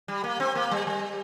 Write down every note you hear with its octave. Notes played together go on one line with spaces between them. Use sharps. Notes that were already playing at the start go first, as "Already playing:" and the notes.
G3
A#3
C4
A#3
G3
G3